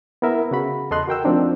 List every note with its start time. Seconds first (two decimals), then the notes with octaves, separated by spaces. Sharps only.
0.22 B3 E4 A#4 E5
0.51 C#3 F#4 B5
0.91 E2 A4 D#5 C6 F#6
1.07 F#4 A#4 G5 E6
1.24 F3 A3 C4 D4 D#4